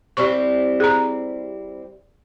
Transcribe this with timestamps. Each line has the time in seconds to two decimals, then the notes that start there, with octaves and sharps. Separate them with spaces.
0.17 G3 C4 E4 D5 C#6
0.80 G#4 A#5